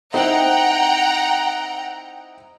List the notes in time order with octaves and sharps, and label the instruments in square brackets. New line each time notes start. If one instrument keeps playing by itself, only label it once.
[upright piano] C4 D#4 E4 [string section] F#5 G5 A#5